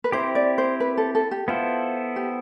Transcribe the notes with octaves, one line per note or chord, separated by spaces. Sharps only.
B4
C4 E4 G4 C5
D5
C5
B4
A4
A4
G4
B3 E4 F4 A4 C5
G4